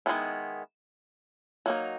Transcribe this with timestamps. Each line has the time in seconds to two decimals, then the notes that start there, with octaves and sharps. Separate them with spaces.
0.06 D#3 G#3 B3 E4
1.66 F#3 A#3 D#4